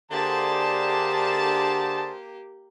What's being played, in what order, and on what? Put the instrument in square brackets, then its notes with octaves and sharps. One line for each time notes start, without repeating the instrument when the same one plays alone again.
[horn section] D3 A5 [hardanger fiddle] A#3 G4 [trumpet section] D4 G#4 C5